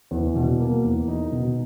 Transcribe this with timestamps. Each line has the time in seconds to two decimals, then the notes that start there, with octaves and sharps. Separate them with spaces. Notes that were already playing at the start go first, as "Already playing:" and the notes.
0.11 E2
0.36 B2
0.60 A#3
0.84 E2
1.08 D#4
1.32 B2